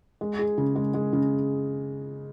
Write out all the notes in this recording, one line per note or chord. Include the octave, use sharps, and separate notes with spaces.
G#3
G#4
C#3
G#3
G#3
C#3